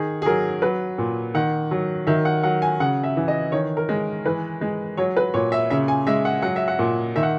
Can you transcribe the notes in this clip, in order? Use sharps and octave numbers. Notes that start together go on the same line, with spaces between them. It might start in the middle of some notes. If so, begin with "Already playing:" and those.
Already playing: D#3 G#4
G#4
F#3 A#4
F#3 B4
A#2
D#3 F#5
F#3
D#3 E5
F#5
F#3 F#5
G#5
C#3 F#5
E5
E3
D#5
D#3 C#5
A#4
G#3
E3 B4
G#3
F#3 C#5
B4
A#2 C#5
E5
C#3 E5
G#5
G#3 E5
F#5
F#3 F#5
E5
F#5
A#2
D#3 E5
F#5